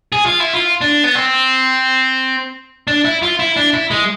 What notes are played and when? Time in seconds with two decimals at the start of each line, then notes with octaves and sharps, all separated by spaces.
0.12 G#4
0.26 F4
0.40 E4
0.54 F4
0.81 D4
1.04 B3
1.15 C4
2.88 D4
3.05 E4
3.22 F4
3.39 E4
3.56 D4
3.74 E4
3.91 G#3